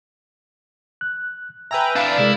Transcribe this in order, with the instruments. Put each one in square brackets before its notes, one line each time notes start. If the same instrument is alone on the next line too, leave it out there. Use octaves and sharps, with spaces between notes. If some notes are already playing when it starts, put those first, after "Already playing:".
[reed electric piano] F#6
[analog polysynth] B4 G5 A#5 [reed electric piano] E5 G#5 E6
[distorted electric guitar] D4 E4 [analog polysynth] D5 F5
[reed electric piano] C3 G#3 A#4 [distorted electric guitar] E4